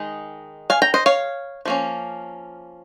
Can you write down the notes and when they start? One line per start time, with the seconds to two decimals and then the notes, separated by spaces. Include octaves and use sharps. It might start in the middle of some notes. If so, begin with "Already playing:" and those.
Already playing: D#3 G#3 D#4
0.70 F5 G#5
0.82 G5 A#5
0.94 C5 D#5
1.06 C#5 F5
1.65 F3 A#3 C#4